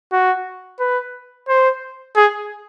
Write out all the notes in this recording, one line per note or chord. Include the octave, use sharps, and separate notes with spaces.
F#4
B4
C5
G#4